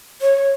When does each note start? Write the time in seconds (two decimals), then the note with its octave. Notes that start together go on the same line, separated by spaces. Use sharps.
0.22 C#5